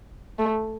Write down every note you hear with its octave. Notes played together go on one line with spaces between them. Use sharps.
A3